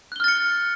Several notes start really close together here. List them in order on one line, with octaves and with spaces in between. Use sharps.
F#6 G7 F6 A6 C#7